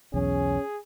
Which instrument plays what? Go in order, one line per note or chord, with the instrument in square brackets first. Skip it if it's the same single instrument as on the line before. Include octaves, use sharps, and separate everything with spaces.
[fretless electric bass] B1 E2 [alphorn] C#4 [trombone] G#4